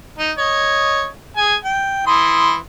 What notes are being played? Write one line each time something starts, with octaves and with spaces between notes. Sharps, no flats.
D#4
C#5 D#5
G#4 G#5
G5
E3 C6 D#6